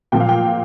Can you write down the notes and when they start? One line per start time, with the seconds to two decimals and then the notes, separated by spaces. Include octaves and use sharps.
0.12 A#2 F3 G5
0.20 F5
0.29 G5